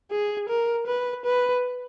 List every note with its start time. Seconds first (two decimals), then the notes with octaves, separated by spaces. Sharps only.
0.11 G#4
0.49 A#4
0.87 B4
1.25 B4